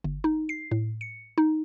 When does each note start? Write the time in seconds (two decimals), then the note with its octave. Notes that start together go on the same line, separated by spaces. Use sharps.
0.04 G1
0.24 D#4
0.49 C7
0.71 A2
1.01 C#7
1.38 D#4